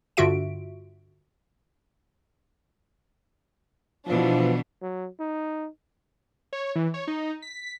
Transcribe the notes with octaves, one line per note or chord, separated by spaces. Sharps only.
G2 D3 F4 F#4 E5 D7
B2 E3 F3 D4
F#3
D#4
C#5
E3
C#5
D#4
B6